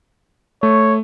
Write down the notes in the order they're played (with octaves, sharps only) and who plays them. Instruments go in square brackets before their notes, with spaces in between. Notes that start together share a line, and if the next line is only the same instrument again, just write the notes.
[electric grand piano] A3 [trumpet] C#5